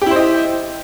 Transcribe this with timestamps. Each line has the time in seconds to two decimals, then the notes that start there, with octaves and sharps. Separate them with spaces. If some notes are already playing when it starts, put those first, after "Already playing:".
0.02 G4
0.06 E4
0.11 C5
0.16 D#5